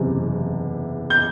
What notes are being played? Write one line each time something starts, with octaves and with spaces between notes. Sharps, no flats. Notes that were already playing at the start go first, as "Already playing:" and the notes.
Already playing: F#1 E2 C3
G6